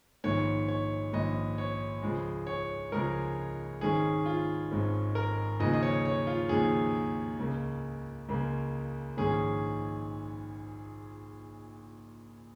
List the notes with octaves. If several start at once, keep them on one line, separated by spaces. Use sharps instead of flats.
A#1 G#2 D#3 C#5
C#5
A#1 G#2 D#3 D#5
C#5
C#2 C#3 F3 G#3
C#5
C#2 C#3 F3 G#3 A#4
G#1 G#2 D#3 C#4 G#4
F4
G#1 G#2 D#3 C#4
A#4
D#2 C#3 F3 G#3 D#4 D#5
D#5
C#5
C#5
F4
D#2 C#3 F3 G#3 D#4 G#4
C#2 C#3 A#3
C#2 C#3 A#3
A#1 G#2 D#3 C#4 G#4